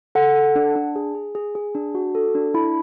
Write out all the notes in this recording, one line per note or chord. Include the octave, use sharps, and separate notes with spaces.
A4 F#5
A4
D4
D4
G#4
G#4
G#4
G#4
D4
F#4
A4
D4
E4 B5